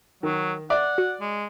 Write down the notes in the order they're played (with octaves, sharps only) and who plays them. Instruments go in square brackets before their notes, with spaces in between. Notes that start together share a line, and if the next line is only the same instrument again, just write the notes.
[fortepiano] D#3 [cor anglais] F#3
[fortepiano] D5 [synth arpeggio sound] E5 [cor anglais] F#5
[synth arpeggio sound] F#4
[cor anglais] G#3